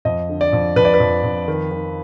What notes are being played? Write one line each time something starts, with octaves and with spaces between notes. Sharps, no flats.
F2 D#5
D3
D5
F2
F2 B4
D5
B4
F2
F2
D#3
D#3